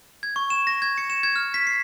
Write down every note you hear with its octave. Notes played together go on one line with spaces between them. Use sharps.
G#6
C#6
E7
A#6
G#6
C#7
E7
G#6
F6
B6
C7